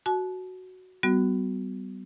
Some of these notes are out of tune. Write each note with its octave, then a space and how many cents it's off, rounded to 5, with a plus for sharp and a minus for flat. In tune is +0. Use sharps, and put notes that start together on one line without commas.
F#4 +0 A5 -35
G3 -30 B3 +30 F#4 +0